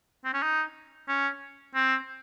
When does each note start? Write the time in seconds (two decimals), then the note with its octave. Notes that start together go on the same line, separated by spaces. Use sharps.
0.25 C4
0.34 C#4
0.43 D#4
1.08 C#4
1.75 C4